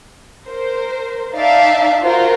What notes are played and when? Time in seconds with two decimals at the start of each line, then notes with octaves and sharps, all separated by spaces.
0.46 A#4 C5
1.34 D#4 D5 E5 F5 A5
2.03 F4 F#4 A#4 C5